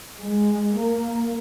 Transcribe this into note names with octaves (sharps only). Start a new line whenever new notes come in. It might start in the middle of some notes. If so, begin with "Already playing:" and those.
G#3
A#3